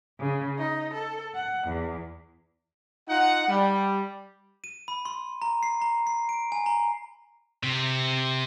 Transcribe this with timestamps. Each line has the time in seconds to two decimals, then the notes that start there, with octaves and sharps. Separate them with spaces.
0.18 C#3
0.59 D#4
0.93 A4
1.35 F#5
1.66 E2
3.09 D#4 F4 F#5
3.49 G3
4.64 D#7
4.88 B5
5.05 C6
5.42 A#5
5.63 C7
5.81 A#5
6.07 C7
6.29 D7
6.52 G#5
6.66 A#5
7.63 C3